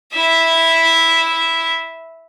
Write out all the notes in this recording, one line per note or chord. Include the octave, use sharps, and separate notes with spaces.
E4 E5